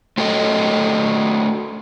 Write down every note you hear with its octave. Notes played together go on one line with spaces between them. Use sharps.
A3 F#4 G4 A4 D#5